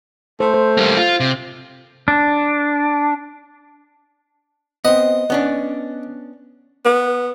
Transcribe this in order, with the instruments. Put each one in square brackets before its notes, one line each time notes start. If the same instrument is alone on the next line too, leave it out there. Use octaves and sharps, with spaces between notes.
[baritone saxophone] A3 [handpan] C5
[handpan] C5
[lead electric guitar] G3 A#3
F4
C3
[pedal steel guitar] D4
[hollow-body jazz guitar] B3 C4 [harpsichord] D#5
[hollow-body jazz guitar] B3 C#4 D4
[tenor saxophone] B3